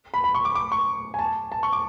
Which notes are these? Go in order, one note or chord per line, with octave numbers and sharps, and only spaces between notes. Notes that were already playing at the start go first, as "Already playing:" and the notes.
B5
B5
C#6
D6
D6
C#6
G#5
A5
A5
C#6
D6